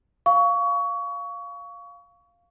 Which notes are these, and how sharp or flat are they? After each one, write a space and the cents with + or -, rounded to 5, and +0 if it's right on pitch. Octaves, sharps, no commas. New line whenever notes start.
F5 +0 C#6 +25